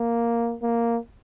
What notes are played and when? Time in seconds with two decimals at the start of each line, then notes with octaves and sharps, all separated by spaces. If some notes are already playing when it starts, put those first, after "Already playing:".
Already playing: A#3
0.63 A#3